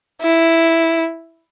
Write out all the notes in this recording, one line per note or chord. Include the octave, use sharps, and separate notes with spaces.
E4